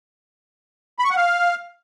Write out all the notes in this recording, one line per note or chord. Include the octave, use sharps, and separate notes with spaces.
B5
C#6
F#5
F5